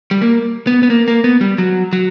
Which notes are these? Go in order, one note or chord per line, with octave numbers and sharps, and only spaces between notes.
G3
A#3
B3
B3
A#3
A#3
B3
G3
F#3
F#3